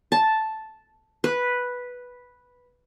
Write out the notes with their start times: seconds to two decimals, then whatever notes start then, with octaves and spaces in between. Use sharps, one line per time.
0.12 A5
1.24 B4